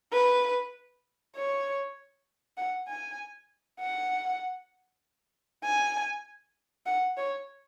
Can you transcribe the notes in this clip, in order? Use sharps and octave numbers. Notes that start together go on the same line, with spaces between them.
B4
C#5
F#5
G#5
F#5
G#5
F#5
C#5